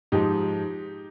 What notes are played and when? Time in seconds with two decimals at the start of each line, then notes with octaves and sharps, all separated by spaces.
0.12 G#2 F3 D#4 G4